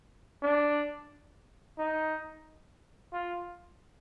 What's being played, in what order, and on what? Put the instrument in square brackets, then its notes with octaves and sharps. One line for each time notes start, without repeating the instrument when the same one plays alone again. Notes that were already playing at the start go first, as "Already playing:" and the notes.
[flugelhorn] D4
D#4
F4